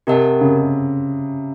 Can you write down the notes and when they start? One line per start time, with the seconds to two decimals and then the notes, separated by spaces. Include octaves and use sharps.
0.07 C3 G4 A#4 D#5 F#5 A5
0.41 C#3